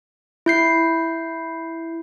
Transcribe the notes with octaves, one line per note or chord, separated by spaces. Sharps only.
E4 G6 C7